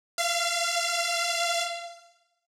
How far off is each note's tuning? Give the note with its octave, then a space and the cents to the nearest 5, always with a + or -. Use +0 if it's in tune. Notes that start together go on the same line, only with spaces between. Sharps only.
F5 -30